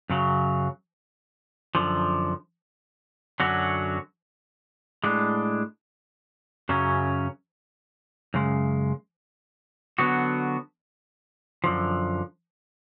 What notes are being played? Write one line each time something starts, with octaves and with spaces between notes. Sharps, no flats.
F#2 C#3 F#3
F#2 D3 F3
F#2 D3 F#3 C#4 F#4
A2 G#3 D4
F#2 C#3 F#3 C#4
F#2 C#3 G#3
D3 F#3 B3 F#4
F#2 D3 F3